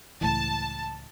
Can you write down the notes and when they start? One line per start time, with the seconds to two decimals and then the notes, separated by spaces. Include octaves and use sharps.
0.21 C#2 A2 E3 A5